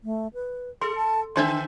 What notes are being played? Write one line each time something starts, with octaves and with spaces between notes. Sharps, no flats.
A3
B4
G#4 A4 C6
A5
D3 D4 D#4 C5 E5 G5 C6